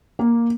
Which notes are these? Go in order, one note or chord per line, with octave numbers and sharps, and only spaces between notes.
A#3